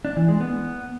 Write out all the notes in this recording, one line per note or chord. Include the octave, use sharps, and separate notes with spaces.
D4
E3
G#3
B3